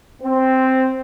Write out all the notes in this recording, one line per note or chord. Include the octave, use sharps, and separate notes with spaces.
C4